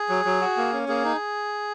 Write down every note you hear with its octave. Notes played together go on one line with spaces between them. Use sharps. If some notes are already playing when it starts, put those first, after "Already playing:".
Already playing: G#4
F#3
F#3
F#4
A#3
C#4
A#3 G#4
D#4